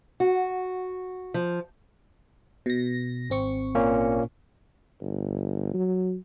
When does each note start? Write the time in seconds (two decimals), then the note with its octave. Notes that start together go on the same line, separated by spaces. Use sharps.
0.20 F#4
1.34 F3
2.66 B2 A#6
3.30 G#1 C4 C#6
3.75 A#2 A#3 C#4
5.01 G1
5.74 F#3